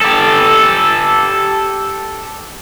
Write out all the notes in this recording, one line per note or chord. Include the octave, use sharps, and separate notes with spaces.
G4 A4